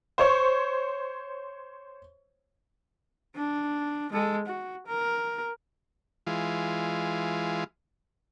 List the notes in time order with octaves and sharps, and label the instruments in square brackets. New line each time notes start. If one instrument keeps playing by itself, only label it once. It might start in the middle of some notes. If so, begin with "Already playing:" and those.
[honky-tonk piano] C5 C#5 C#6
[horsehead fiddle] D4
G#3 A4
F#4
A#4
[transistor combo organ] E3 G#3 F4